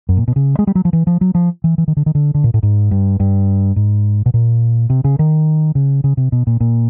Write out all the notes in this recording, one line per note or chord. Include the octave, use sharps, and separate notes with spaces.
F#2
A#2
B2
C#3
G#3
G3
F#3
F3
E3
F3
F#3
F3
E3
E3
D#3
D3
D#3
D3
D3
A#2
A2
G#2
G2
G2
G#2
B2
A#2
C3
C#3
D#3
C#3
C#3
C3
B2
A#2
A#2